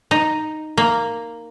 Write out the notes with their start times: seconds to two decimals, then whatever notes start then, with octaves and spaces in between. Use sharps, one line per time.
0.11 D#4
0.77 A#3